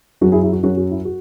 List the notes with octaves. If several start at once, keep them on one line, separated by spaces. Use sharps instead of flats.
F#2 F#3 C#4 F#4
E4 G#4
E4 G#4
F#4
F#2 F#3 C#4 F#4
F#4
E4
F#4